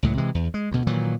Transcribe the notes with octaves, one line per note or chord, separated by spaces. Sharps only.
C#2 A2 F#3
C3 E3 G#3
E2
G#3
D2 B2
A#2 D#3 E3 F#3